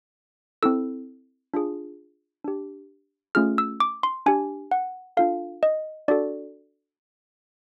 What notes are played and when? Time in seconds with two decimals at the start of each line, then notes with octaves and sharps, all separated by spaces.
0.63 C4 E4 A4 E6
1.54 D4 F4 G#4
2.44 D4 G4
3.35 A3 C#4 F4 G#4 F6
3.58 E6
3.80 D6
4.03 C6
4.26 D4 G4 G#5
4.71 F#5
5.17 D4 F4 A4 F5
5.63 D#5
6.08 D4 F#4 A4 D5